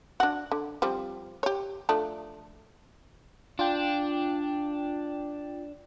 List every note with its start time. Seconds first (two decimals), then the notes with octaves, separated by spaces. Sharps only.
0.20 D4 F#4
0.52 D3
0.82 F3 G3 C4
1.43 G4 C#5
1.89 F3 A3 D4
3.59 D4 F4 G5